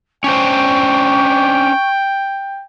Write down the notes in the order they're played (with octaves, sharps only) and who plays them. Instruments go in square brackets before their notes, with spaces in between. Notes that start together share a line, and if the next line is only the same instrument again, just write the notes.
[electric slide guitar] C#4 D4 C5 [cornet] G5 [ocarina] C#6